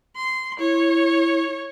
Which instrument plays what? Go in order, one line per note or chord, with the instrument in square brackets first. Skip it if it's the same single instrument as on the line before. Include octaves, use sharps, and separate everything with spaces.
[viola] C6
[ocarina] E4 [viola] C#5